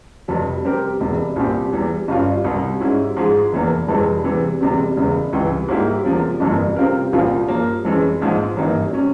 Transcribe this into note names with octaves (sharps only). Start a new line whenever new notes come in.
F1 F2 C3 G3
C3 G3 C4 G4 A#4
E1 E2 C3
C2 A#2 G3 C4 G4
E2 E3 G3
G1 G2 G3 C#4 F4
C2 C3 G3
G#2 G3 C#4 E4
G#2 F3 G#3
F1 E2 E3 A#3
F1 F2 C3 E3 G#3
E2 C3 E3
E1 E2 C3 G3 C4
E1 E2 C#3
C#2 C3 E3 G3
G#2 G3 A#3 E4 G4
E2 C3 F3 A#3
G1 F2 C3 E3 A#3
C3 G3 C4 F4 A#4
C2 A#2 F3 C4 F4
G2 F3 A#3
F2 E3 G#3 C#4
A#1 G#2 F3 G#3
G#1 G2 E3 A#3
C3 G3 C#4